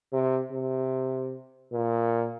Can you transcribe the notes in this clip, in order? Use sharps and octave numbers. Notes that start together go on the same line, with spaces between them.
C3
C3
A#2